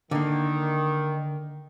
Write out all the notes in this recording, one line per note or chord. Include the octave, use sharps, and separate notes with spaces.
D3 D#3 A#3